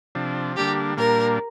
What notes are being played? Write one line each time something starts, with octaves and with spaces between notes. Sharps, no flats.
C3 F3 D4
D3 G3 A#3 D4 G4
A#2 G3 A#3 D4 A#4